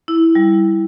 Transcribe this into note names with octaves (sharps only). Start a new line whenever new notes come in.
E4
G3